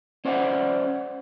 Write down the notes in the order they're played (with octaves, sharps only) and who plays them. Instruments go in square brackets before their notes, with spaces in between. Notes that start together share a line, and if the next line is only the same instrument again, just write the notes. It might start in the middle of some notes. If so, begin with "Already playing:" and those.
[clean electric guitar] C#4 C5 D5 E5 F#5